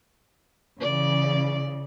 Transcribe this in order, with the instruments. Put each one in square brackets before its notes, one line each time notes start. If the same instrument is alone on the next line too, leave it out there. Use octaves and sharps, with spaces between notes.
[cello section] C#3 E3 [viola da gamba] D5